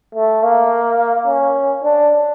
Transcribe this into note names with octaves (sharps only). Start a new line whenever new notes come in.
A3
A#3
C#4
D4